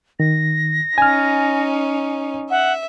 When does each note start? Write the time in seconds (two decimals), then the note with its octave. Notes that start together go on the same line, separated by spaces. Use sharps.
0.20 D#3 A#6
0.98 C#4 D#4 G#5 F6
2.50 E5 F#5